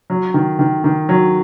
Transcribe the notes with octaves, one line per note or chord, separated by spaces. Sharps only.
F#3
D#3
D#3
D#3
F#3